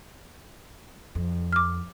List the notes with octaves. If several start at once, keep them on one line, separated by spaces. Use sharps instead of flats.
F2
D6 F6